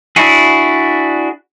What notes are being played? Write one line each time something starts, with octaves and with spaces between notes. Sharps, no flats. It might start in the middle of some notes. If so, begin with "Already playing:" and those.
D4 E4 F#4 G#4